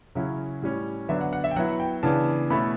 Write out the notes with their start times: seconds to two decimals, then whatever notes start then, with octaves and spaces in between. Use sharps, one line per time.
0.15 C#3 F#3 C#4 E4
0.62 A2 G3 C#4
1.09 D3 F#3 B3 D4 E5
1.21 F#5
1.33 F#5
1.44 E5
1.51 G5
1.56 F#3 B3 E4 F#5
1.80 G5
2.03 C#3 E3 B3 D4 A5
2.50 B2 A3 C#4 E4 B5